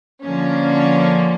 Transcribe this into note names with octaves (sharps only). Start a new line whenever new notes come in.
D3 F3 A#3 C#4